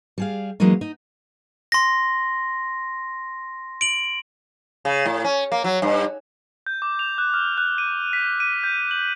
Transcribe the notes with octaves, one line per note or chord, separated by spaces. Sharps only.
G3 G#4 F5
E3 F#3 G#3 A#3 C#4 D#4
D#4
C6 A#6
D7 F#7
C#3
A2
C#4
A#3
F#3
G2
G6
D6
F7
F#6
F6
F#6
D#7
B6
D#7
G6
F#7